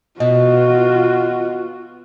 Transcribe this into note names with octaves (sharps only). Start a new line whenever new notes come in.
B2 F4 F#4 D#5